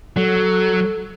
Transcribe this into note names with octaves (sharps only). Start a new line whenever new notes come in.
F#3 A4